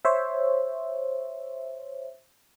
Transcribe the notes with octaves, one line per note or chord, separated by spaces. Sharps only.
C5 C#5 E5